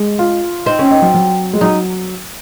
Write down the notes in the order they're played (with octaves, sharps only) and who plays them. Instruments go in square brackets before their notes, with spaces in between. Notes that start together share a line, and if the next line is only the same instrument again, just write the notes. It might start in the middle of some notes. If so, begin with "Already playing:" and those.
Already playing: [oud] G#3
[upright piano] F4
[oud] C4 [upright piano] D#4
[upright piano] C#4
D#4
F#3
F#3
G#3
[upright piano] F#3 [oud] D#4